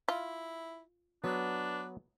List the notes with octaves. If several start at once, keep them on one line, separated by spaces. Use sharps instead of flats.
E4 F4
F#3 B3 D4 B4